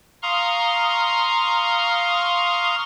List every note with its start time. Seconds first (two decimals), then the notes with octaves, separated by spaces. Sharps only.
0.23 F5 A#5 C6 C#6 D#6 F6